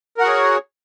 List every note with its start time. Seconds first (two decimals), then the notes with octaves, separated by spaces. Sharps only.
0.18 A#4
0.20 F#5
0.23 F#4
0.25 G#4
0.28 C#5